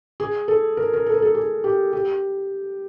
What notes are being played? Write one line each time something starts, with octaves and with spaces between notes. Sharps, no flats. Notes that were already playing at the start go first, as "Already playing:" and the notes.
G#4
A4
A#4
A#4
A4
A#4
A4
G#4
G4
G4